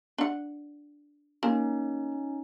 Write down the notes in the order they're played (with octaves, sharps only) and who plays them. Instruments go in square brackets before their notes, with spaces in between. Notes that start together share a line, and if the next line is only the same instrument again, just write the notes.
[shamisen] D4 F#5
[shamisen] A#3 [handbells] C#4 D#4